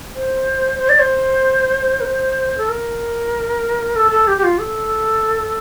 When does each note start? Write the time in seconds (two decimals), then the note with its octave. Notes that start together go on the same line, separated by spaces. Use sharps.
0.15 C5
0.79 C5
0.89 D5
0.99 C5
2.01 A#4
2.05 C5
2.58 A4
2.69 A#4
3.96 A4
4.11 A4
4.27 G4
4.37 G4
4.44 F4
4.59 A4